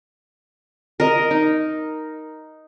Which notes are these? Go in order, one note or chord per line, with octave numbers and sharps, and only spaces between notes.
A#4 D#5
D#4